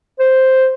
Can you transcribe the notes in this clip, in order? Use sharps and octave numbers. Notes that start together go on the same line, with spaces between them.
C5